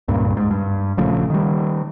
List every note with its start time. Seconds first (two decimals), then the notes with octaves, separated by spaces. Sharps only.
0.08 C#2 G2 A#2
0.37 G#2
0.51 G2
0.97 A#1 C#3 F3 A3
1.30 D#3 G3